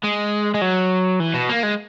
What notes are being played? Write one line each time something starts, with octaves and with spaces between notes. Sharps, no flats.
G#3
G#3
F#3
E3
B2
A#3
G#3